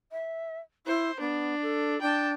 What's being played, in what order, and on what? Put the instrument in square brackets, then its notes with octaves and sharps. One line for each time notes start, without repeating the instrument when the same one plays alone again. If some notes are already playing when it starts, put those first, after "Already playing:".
[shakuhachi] E5
[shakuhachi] E4 [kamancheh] C5
[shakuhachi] B3 [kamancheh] D4
[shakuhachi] A4
[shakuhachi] D4 [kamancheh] G5 A5